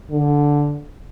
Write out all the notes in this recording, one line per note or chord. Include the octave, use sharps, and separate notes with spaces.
D3